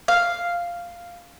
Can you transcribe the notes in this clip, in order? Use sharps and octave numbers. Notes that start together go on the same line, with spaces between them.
F5